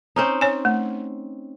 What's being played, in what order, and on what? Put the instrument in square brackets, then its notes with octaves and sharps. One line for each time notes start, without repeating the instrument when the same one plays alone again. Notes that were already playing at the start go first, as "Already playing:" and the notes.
[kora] C4 C#4 D#4
[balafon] C#5 G#5
A3